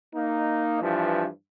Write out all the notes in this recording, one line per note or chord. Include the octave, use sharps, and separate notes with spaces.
A#3 D#4
G2 E3 F3